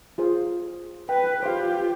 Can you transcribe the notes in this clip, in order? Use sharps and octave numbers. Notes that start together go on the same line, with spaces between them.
F4 G#4 C5
B4 G5
F4 G4 C5 F5